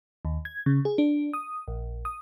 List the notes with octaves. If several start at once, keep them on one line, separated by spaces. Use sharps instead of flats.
D#2
G#6
C#3
G#4
D4
D#6
A#1
D#6